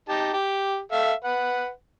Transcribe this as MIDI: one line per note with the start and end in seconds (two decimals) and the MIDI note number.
0.09 0.32 63
0.09 0.32 67
0.09 0.32 81
0.33 0.78 67
0.92 1.13 69
0.92 1.13 76
0.92 1.13 77
1.24 1.69 71
1.24 1.69 78